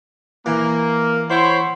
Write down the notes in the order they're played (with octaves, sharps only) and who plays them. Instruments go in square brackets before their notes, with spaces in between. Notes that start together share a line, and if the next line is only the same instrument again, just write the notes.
[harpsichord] E3 [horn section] A#3
[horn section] E4 C5 C#5 [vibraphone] F#5 C6